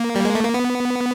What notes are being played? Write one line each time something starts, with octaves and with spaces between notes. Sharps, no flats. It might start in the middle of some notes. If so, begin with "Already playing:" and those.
Already playing: A#3
G3
G#3
A3
A#3
B3